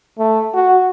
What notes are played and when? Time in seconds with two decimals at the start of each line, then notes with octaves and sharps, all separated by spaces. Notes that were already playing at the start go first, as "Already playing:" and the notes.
0.19 A3
0.54 F#4